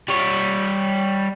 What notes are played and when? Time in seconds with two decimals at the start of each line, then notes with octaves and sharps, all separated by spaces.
0.09 G3 C#5